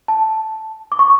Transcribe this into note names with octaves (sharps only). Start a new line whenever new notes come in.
A5
D6
C#6